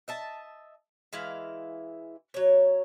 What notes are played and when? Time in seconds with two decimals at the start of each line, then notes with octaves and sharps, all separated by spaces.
0.08 D#5 E5 A5
1.13 E3 G#3 E4 F5
2.34 F#3 C#5